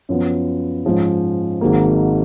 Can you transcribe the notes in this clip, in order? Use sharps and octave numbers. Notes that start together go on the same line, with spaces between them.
F#2 F3 B3
G#2 F3 G#3 C#4
G#1 G#2 D#3 F#3 A#3